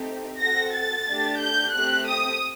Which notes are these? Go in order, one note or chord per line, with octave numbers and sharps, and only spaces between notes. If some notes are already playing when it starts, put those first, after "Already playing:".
Already playing: A3 C4 D#4 G4
C4 F#4 A4 A#6
A6
A3 D4 G4
G6
A3 C4 G4 F#6
D#6